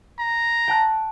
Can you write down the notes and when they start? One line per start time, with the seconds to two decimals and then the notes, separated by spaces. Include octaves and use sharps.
0.19 A#5
0.68 G5 A5 F#6